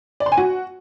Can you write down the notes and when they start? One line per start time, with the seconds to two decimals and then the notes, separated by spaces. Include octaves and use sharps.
0.20 D5
0.26 C6
0.32 G#5
0.38 F#4